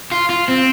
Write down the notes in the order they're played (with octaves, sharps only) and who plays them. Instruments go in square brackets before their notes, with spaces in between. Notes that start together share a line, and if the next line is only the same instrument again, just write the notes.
[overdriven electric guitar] F4
F4
C4